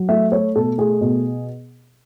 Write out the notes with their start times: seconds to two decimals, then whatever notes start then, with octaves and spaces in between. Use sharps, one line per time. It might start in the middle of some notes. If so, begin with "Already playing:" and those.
Already playing: F#3
0.09 A3 E5
0.32 A3 C#5
0.56 B2 A4
0.78 A3 G#4
1.01 B2